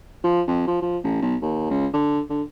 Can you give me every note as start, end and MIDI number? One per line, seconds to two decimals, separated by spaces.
0.24 0.41 53
0.47 0.66 41
0.67 0.79 53
0.82 0.98 53
1.04 1.19 33
1.22 1.36 35
1.42 1.68 39
1.70 1.87 37
1.93 2.20 50
2.30 2.42 50